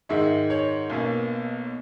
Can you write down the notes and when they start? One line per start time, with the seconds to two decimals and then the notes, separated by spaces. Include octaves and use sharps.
0.09 G#2 D#3 G#3 E5
0.50 C#5
0.90 B1 B2 A#3 C#4